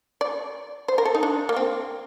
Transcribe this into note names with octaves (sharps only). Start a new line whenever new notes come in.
D5
C5
A#4
A4
D#4
D4
A#3
C4